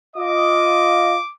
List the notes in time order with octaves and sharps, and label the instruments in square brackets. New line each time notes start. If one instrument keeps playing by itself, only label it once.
[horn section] F4 D#5 [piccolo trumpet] D6